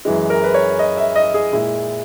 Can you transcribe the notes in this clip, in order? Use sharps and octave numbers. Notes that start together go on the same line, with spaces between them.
F#2 E3 G#3
A#4
B4
C#5
D#5
E5
D#5
G#4
A#2 G#3 E4